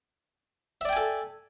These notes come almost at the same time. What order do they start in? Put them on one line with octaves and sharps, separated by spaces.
E5 D5 G5 G#5 A4